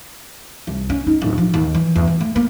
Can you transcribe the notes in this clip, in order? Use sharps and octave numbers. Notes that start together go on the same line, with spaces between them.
C2
C#4
D#4
D1
F3
D#2
E3
E2
E3
A3
A#3